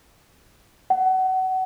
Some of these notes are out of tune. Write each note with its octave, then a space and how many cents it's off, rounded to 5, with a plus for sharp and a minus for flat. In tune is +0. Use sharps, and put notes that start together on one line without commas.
F#5 +25